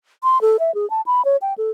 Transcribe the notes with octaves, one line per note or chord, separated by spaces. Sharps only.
C6
A4
E5
G#4
A5
B5
C#5
G5
A4